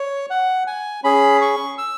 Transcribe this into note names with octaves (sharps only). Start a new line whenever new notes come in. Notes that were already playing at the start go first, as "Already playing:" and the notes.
Already playing: C#5
F#5
G#5
C#4 G#4 B5
C#6
E6